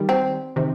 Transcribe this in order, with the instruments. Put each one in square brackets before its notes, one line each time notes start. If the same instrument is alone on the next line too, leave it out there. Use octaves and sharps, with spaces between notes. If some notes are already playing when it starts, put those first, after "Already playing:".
Already playing: [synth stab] D#3 G3
[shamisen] C4
[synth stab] C3 D#3